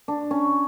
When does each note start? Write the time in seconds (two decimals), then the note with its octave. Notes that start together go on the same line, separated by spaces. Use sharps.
0.08 D4
0.31 C#4